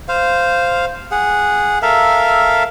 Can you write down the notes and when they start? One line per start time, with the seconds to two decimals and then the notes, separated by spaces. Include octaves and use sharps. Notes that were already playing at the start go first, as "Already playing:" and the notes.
0.09 C5 F5
1.12 G#4 F#5
1.82 A4 A#4 E5 F5